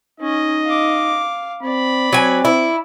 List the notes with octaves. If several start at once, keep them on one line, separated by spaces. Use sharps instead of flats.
C#4 D#4 D#5
F5 D6
C4 D5 B5
F#3 C4 G#5
E4